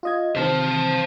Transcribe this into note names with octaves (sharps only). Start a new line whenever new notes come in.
F4 D#5 G#6
C3 D#3 C4 C5 A5